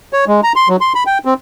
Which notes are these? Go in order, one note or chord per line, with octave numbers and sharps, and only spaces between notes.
C#5
G#3
A#5
C6
F#3
C6
B5
G5
C4